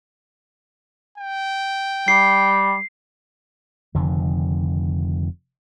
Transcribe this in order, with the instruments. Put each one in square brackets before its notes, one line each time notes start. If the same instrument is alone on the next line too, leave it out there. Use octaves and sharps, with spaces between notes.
[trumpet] G5
[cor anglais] G3 [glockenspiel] C7
[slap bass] F1 F2 D3 D#3